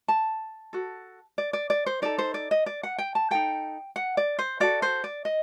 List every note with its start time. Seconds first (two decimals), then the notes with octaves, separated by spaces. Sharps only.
0.08 A5
0.73 F#4 A4
1.38 D5
1.53 D5
1.70 D5
1.86 C5
2.02 D#4 A4 D5
2.18 C5
2.34 D5
2.51 D#5
2.66 D5
2.83 F#5
2.98 G5
3.15 A5
3.31 D#4 A4 G5
3.96 F#5
4.17 D5
4.39 C5
4.60 F#4 A4 D5
4.82 C5
5.04 D5
5.25 D#5